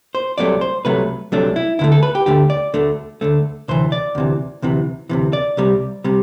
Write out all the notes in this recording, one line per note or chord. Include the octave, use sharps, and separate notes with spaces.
C5
C2 C3 F#3 A3 D5
C5
C2 C3 F#3 A3 B4
C2 C3 F#3 A3 D4
E4
D2 D3 A3 E4
A4
B4
G4
D2 D3 A3 G4
D5
D2 D3 A3
D2 D3 A3
D2 C3 E3 C5
D5
D2 C3 E3
D2 C3 E3
D2 C3 E3
D5
C2 C3 G3
C3 G3